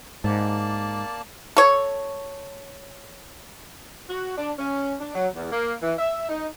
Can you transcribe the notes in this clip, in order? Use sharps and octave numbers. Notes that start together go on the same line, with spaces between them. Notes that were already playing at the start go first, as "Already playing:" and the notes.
G#2 A#3 D5 A5
A4 C#5
F#4
D4
C#4
D4
F#3
E2
A#3
E3
E5
D#4